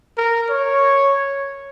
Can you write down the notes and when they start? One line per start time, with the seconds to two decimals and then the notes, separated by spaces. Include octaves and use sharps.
0.18 A#4
0.49 C#5